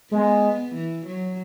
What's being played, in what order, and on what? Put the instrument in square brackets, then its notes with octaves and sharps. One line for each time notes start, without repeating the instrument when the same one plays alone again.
[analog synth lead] G#3 [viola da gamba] B3
[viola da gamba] E3
F#3